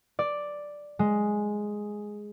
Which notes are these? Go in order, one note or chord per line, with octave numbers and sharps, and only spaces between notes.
D5
G#3